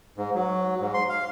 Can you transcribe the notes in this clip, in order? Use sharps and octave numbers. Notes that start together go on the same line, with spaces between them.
G#2
F#3
G#2
C6
F5